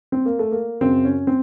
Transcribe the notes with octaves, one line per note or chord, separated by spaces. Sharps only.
C4
A#3
A3
A#3
F#2 C#3 C4
C#4
C4